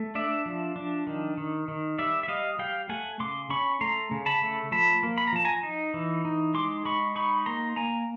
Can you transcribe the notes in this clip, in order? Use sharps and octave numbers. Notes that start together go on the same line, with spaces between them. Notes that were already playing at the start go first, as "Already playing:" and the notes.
Already playing: A3
D4 D5 E5
F3
D4
D#3
D#3
D#3
G3 D5 E5
E5
G3 D#5 F5
G3 F5 G5
A3 F#5 G#5
C#3 C6 D6
C#4 B5 C#6
A3 A#5 C6
C#3
A5 B5
A3
F3 A5 B5
A#3
B5
A#5
F3 A5
G#5 A#5
D#4
E3
D#4
G#3 C6 D6
G#3 B5 C#6
D#4 B5 C#6
A#3 A#5 C6
A#3 G#5 A#5